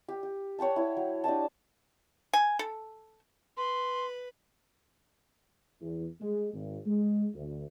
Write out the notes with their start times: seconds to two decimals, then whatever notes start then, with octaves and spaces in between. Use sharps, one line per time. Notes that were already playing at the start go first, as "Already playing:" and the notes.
0.08 G4
0.23 G4
0.59 C#5 F#5 G5 A5
0.76 E4 C#5
0.97 F#3
1.24 D4 G4 D#5 A5
2.33 G#5
2.59 A4
3.57 B4 C6
5.81 E2
6.21 G#3
6.54 G#1
6.86 G#3
7.35 D2